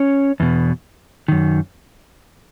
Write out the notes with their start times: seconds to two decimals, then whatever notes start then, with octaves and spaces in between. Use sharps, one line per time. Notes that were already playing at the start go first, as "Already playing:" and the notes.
Already playing: C#4 C#5
0.40 E2 B2
1.28 F#2 D#3